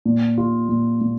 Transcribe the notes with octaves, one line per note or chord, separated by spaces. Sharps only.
A#2
F4
A#2
A#2